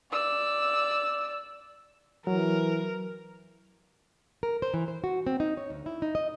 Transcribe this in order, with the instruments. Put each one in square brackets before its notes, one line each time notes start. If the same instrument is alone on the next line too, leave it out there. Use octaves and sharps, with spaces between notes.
[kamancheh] D5 E6
[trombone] E3 [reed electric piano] F#3 [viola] A#4
[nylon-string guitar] A#4
C5
E3
C5
F#4
C4
D#4
C#5
D2
E4
D#4
D#5